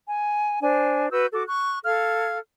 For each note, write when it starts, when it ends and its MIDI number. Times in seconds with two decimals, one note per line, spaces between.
0.08 0.59 80
0.61 1.08 62
0.61 1.08 72
0.61 1.08 80
1.11 1.26 66
1.11 1.26 71
1.11 1.26 88
1.11 1.26 91
1.33 1.43 66
1.33 1.43 69
1.33 1.43 86
1.47 1.78 85
1.47 1.78 90
1.84 2.38 69
1.84 2.38 77
1.84 2.38 89
1.84 2.38 92